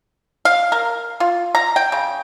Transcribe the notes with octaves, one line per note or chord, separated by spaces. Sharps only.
F5
A#4
F4
A#5
G5
C#3